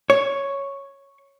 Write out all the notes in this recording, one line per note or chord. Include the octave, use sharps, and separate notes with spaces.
C#5